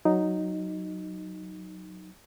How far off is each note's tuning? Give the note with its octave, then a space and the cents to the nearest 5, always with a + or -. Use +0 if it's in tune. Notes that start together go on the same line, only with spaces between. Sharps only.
F#3 +0 D#4 +0